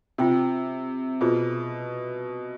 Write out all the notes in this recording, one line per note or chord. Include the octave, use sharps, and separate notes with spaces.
C3 F4 C5 G5 C6
B2 F4 G#4 C5